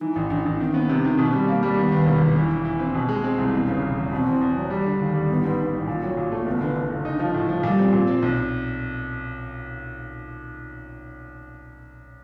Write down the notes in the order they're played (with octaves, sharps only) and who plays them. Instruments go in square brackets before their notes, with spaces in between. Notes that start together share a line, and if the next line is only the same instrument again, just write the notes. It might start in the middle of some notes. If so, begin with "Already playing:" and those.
[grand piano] E3 [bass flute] D#4
[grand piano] A1
[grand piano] A1 [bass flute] D4
[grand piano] A1
[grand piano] D#3 [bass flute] C4
[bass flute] C#4
[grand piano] B3 [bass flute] C4
[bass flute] C#4
[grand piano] C3 [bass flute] C4
[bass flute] C#4
[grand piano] D#3 [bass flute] C4
[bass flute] C#4
[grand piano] B2 [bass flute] C4
[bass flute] C#4
[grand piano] G3 [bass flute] C4
[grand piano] A#3
G3
[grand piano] D#2 [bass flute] B3
[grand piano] D#2
E1
E1
E3
E3
E3
C4
B2
G#3
C4
C2
[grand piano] E1 [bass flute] B3
[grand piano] C#3
E1
E2
[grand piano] B2 [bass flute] C4
[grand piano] E2
E2
F#3
G3
D3
D#2
G3
[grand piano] A1 [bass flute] B3
[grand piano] G#2
G#2
A1
A#2
F#3
A#2
A3
[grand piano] F#1 [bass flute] B3
[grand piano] D3
D3
F#1
D#4
F3
A2
F3
[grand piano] A#2 [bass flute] G3
[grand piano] C4
A#2
C4
B1